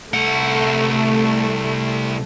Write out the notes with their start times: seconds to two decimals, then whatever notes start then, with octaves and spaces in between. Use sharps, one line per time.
0.14 C2 A3 F#5